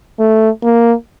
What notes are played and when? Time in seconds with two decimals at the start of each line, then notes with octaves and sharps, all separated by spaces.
0.19 A3
0.63 A#3